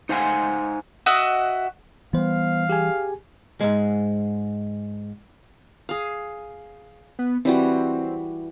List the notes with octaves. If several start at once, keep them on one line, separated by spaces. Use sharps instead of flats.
D#4 C5 F5 F#5 G#5
F#4 D#5 E5 F#5
E3 G3 B3 C5 F5
G4 G#4 G#5
G#2 G#3
G#4 F5
B3
E3 G3 C4 F#4